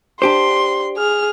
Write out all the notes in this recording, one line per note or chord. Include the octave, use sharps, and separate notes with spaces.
D4 G4 C5 C6
G#4 F6